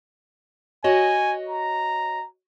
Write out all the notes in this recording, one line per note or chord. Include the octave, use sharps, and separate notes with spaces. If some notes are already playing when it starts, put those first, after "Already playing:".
F#4 C#5 D#5 G#5
A#5